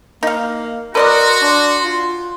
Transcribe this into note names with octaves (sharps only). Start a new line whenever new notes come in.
A#3 D#4 F5
F#4 A#4 B4 D5 D#5 C6
D4
F4